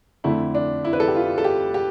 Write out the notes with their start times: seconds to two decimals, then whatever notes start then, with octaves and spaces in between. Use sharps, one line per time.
0.24 F2 D3 A3 E4
0.55 D4
0.85 E4
0.93 B4
1.00 A4
1.08 G4
1.15 F4
1.38 A4
1.44 G4
1.74 G4